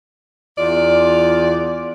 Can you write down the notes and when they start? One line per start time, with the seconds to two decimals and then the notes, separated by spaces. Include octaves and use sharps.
0.58 E2 F4 D5